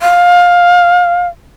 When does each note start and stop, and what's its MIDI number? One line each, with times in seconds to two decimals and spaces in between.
0.02 1.28 77